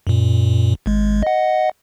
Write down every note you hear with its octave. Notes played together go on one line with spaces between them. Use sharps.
F#2 A#2
G#1 G#3
D#5 F#5